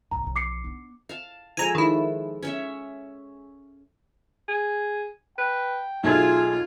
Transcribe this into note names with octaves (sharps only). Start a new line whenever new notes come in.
B1 G#2 A#5
B1 F3
D6 C7 C#7
B3 D4
F5 A5
F3 G#3 A4 G#5 A#5
D#3 E4
C#4 C#5 E5
G#4
B4 G5
B1 A3 F4 G#4 A4 G#6